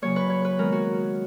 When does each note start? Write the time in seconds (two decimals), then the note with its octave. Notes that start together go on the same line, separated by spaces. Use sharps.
0.02 C#3 F#3 A#3 C#5
0.16 B4
0.30 C#5
0.45 B4
0.58 D#3 G#3 B3 A#4
0.72 F#4